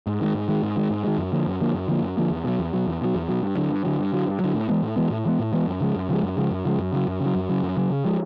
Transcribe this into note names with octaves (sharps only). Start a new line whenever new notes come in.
G#2
D#3 G#3
G#2
D#3 G#3
G#2
D#3 G#3
G#2
D#3 G#3
F#2
D3 F3 A#3
F#2
D3 F3 A#3
F#2
D3 F3 A#3
F#2
D3 F3 A#3
E2
B2 F#3
E2
B2 F#3
E2
B2 F#3
E2
B2 F#3
G2
D3 F#3
G2
D3 F#3
G2
D3 F#3
G2
D3 F#3
A2
E3 G#3 B3
A2
E3 G#3 B3
A2
E3 G#3 B3
A2
E3 G#3 B3
F#2
C#3 F3 G#3
F#2
C#3 F3 G#3
F#2
C#3 F3 G#3
F#2
C#3 F3 G#3
F#2
C#3 F#3
F#2
C#3
F#3
F#2
C#3 F#3
F#2
C#3 F#3
C#3
F3 G#3